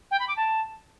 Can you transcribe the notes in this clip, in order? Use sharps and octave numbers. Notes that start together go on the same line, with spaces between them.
G5
B5
D6
A5